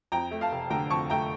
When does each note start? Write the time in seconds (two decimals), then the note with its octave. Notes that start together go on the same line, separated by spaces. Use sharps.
0.12 F2 G5 A#5
0.31 A3
0.41 F5 A5
0.52 F1
0.70 D3 G5 A#5
0.90 F2 A5 C#6
1.10 A3 G5 A#5